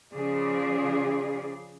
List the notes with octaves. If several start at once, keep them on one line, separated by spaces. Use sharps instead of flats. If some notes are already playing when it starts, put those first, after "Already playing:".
C#3 F3 G#4 D5